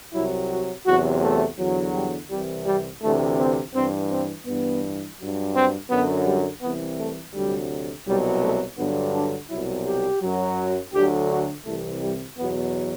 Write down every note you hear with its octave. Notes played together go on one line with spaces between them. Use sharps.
C2 C3 F#3 E4
F#4
E2 C3 F#3 F#4
A3
E2 D3 F#3
G3
C2 C3 E3 G3
G3
D2 C3 E3 A3
C4
G2 E3 C4
C4
G2 E3 B3
G2 F#3
C4
F#2 D3 F#3 B3
G3
C2 C3 E3 B3
A3
D2 C3 F#3 G3
C2 B2 F#3 G3
A3
G2 D3 F#3 B3
D4
C2 B2 F#3 E4
G4
F#2 F#3
D2 D3 F#3 G4
F#4
C2 C3 E3 A3
G3
E2 B2 F#3 B3